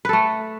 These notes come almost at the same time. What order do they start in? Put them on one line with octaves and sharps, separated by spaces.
B4 A4 A3